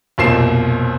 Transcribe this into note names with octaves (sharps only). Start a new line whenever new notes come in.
F1 B1 A#2 C7 E7